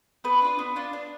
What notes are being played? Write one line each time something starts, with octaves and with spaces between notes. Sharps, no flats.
B3 B4
D4 F4
B3
D4 F4
D4